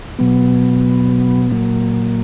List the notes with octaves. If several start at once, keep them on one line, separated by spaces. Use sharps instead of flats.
B2 F#3 B3
A#2 F#3 A#3